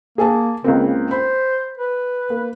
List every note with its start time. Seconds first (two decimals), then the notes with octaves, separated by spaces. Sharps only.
0.18 A#3 G#4 G#5 A5
0.64 C#2 C#3 A#3 C4
1.11 C5 B5
1.78 B4
2.30 A#3